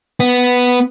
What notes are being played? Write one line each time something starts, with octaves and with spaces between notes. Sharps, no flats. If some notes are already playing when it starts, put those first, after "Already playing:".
B3